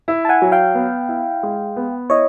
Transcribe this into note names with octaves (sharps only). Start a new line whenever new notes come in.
E4
A5
F#5 G#5
F#3
F5 G5
B3
E4
G#3
B3
E4 C#5 D#5